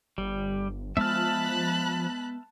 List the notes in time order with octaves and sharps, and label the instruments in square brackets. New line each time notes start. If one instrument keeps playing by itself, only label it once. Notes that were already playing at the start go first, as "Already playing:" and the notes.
[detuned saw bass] G1 [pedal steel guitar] G3
[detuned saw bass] F3 [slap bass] G#3 B3 [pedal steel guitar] E5 F6 [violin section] A5 B5 F#6